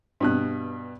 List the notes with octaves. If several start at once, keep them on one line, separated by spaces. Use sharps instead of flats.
G2 B2 F#6